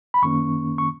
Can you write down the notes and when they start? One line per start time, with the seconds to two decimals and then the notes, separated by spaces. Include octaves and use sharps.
0.14 B5
0.22 F#2 D#3 A#3 C#4 C#6
0.78 C#6